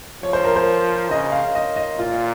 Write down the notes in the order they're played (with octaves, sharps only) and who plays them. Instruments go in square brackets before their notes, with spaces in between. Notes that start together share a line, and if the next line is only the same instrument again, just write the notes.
[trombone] F3 [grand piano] C#5
[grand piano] C5
A#4
C5
[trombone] C#3 [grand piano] D#5
[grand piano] F5
D#5
D#5
[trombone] A#2 [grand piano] F4